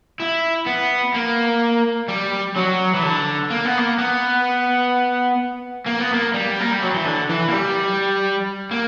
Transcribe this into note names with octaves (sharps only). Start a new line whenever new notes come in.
E4
B3
A#3
G3
F#3
E3
D3
A#3
B3
A#3
B3
A#3
B3
A#3
G3
A#3
G3
F#3
E3
D3
E3
A#3
G3
A#3